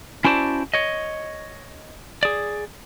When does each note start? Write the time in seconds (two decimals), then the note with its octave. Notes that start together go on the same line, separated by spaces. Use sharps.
0.25 C#4 E4 F#4 C5 D5 A5
0.74 C#5 D#5
2.23 G#4 D5